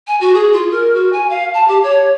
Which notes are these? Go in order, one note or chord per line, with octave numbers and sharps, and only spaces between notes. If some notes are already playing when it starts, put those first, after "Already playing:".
G#5
F#4
G#4
F4
A#4
F#4
G#5
F5
A5
G4
C#5